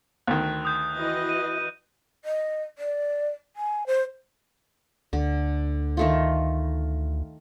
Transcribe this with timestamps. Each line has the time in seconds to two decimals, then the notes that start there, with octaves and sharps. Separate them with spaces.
0.27 D2 D#3 F#6
0.65 D#6 G6
0.96 E3 F#4 D#5
1.29 D#7
2.25 D#5
2.78 D5
3.56 G#5
3.87 C5
5.13 D2 D3
5.97 D#3 A3 F4